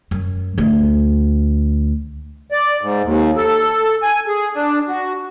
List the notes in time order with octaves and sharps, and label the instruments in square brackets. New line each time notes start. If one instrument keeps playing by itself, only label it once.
[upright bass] F#2
D2
[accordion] D5
G#2
D#2
A4
G#5
G#4
D4
F#4